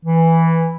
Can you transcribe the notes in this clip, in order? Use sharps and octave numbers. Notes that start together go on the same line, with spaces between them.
E3